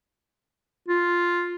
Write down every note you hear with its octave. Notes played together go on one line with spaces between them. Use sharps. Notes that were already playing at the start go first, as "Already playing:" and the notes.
F4